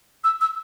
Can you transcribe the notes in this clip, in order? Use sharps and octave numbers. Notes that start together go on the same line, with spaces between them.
E6
E6